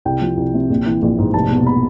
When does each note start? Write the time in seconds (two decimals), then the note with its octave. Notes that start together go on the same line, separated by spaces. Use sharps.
0.05 C2 G5
0.22 F3
0.37 C2
0.54 C3
0.70 A#1
0.86 E3
1.02 A#1
1.18 G#2
1.34 F1 A5
1.51 B2
1.67 B5